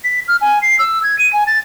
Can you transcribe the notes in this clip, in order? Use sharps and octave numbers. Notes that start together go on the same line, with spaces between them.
B6
F6
G#5
C7
E6
G#6
D#7
G#5
A6